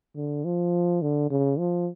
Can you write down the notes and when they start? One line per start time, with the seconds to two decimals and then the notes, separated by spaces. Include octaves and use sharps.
0.16 D3
0.45 F3
1.02 D3
1.31 C#3
1.59 F3